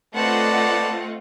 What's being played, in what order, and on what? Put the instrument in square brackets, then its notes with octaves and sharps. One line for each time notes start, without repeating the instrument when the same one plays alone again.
[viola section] A3 C4 F4 [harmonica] B4 A5 [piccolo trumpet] D5 [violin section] D#5 F#5